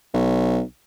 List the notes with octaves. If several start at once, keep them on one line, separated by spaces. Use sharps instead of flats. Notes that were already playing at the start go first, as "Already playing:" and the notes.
B1